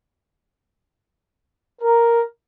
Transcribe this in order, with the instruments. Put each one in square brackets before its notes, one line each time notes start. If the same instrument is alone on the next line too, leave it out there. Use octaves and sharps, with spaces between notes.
[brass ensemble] A#4